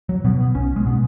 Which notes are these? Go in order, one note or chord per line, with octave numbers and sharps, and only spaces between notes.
F#3
B2 B3
B3
B1 C#4
G#3
B2 B3